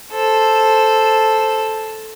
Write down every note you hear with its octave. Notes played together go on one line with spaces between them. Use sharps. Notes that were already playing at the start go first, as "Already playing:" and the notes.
A4 C5